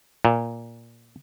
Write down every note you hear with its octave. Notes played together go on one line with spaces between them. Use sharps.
A#2